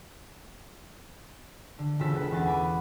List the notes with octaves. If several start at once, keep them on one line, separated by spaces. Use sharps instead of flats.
D3
E1 C#3 F4 A4 B6
C#2 B4
E2 C#4 F#5 A6
G#5 B5 D6